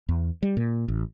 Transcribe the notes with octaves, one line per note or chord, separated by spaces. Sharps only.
E2
G3
A#2
A1